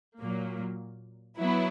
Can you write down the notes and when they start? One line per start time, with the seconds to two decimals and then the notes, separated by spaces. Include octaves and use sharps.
0.19 A#2 F#3 A#3
1.38 F#3 B3 E4